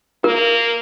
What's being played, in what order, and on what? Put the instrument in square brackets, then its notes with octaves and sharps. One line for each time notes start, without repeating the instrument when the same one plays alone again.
[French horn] A#3 [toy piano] A#4